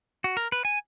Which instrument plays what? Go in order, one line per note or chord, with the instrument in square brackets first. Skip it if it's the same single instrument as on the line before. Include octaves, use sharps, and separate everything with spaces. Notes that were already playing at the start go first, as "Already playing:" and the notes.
[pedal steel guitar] F#4
A#4
B4
G#5